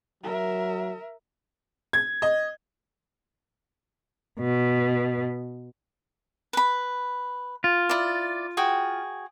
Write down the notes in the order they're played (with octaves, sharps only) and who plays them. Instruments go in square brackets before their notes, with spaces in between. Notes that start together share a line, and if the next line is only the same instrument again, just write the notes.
[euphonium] F#3 [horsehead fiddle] A#4 E5
[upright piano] G#6
D#5
[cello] B2
[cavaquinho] B4 B5
[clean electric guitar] F4
[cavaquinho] E4 D5
F#4 G#4 G5